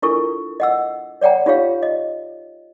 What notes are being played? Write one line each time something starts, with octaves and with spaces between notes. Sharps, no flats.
D4 E4 F4 A4 A#4 C#6
D#5 F#5 E6
C#5 D5 F#5 G5 A#5
D#4 F4 G4 C#5 F5
D#5